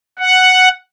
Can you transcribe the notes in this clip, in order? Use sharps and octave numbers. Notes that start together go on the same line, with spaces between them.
F#5